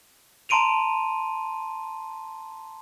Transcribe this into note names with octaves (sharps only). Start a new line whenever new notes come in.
A5 A#5 C6 D7 D#7 F7